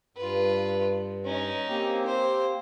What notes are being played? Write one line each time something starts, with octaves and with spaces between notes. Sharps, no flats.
G2 F4 B4
C#4 D#4
A#3 C4 G4
C5